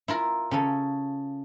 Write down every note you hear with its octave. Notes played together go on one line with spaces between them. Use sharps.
E4 F4 A#4
C#3 C#4 A4